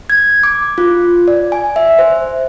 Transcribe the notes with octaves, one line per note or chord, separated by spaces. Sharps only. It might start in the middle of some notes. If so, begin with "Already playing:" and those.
G#6
D6
F4
D5
G#5
E5
C5